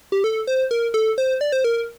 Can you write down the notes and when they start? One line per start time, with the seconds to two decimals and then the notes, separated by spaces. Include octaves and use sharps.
0.12 G4
0.24 A4
0.47 C5
0.71 A#4
0.94 A4
1.18 C5
1.41 D5
1.52 C5
1.64 A#4